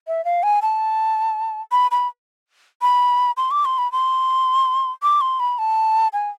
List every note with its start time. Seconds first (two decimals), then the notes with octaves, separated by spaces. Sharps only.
0.07 E5
0.25 F5
0.43 G#5
0.62 A5
1.72 B5
1.91 B5
2.82 B5
3.37 C6
3.51 D6
3.65 C6
3.78 B5
3.92 C6
5.03 D6
5.21 C6
5.40 B5
5.58 A5
6.13 G#5